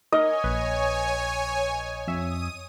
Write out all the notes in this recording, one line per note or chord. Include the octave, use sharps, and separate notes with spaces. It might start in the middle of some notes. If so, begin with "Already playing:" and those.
D#4 A#4 C#5 D#5 G#5
A#1 B4
F2 E5 D#6 D#7